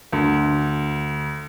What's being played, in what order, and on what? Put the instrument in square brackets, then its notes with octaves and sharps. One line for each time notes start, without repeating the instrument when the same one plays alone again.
[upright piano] D2